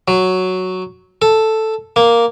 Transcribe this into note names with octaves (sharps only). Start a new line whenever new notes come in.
F#3
A4
A#3